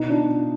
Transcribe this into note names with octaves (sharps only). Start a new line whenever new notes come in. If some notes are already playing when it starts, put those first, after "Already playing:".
Already playing: B2 B3 D#4
D4 F4